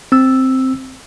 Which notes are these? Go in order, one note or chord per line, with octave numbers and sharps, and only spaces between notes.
C4 E6